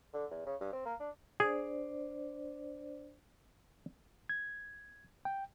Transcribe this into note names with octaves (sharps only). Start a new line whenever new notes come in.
D3
E2
C#3
G2
C4
A#3
D4
D4 G#4 C5 D5
G#6
G5